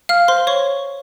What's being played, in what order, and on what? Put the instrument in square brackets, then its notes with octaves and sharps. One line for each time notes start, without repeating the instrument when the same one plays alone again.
[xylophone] F5 F6
C5 C6
C#5 C#6